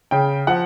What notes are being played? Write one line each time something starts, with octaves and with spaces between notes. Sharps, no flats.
C#3 G5
F3 F#5